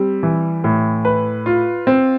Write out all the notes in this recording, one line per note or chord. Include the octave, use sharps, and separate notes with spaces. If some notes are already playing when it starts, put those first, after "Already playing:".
Already playing: G3 C4
E3
A2
B4
F4
C4